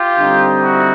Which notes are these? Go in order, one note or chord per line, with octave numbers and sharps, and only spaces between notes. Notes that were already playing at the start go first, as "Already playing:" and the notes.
Already playing: F4 G4
D3 G3 C4 D#4
E4 F#4